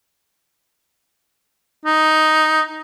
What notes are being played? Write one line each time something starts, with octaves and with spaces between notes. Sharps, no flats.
D#4